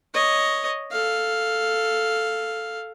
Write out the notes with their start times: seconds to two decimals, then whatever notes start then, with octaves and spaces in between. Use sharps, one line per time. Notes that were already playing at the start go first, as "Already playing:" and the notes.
0.14 C#5 D#5
0.92 A4 F5